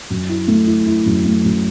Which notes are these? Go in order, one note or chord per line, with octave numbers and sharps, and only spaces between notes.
F#2
E4
A3
E4
E4
F#2
A3
F#2